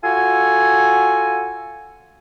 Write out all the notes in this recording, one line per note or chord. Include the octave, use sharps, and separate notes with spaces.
F4 F#4 A4 G#5